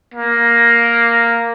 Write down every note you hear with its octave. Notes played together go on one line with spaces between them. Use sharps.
A#3